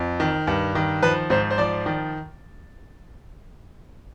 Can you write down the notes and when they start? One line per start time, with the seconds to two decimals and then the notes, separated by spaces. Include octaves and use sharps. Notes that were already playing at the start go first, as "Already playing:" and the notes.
Already playing: F2
0.20 D#3
0.47 G2
0.75 D#3
1.02 F3 B4
1.30 G#2 C5
1.50 C5
1.58 F3 D5
1.86 D#3